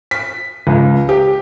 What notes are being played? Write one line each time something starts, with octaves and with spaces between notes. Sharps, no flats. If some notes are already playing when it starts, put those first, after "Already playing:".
B6
C#2
G4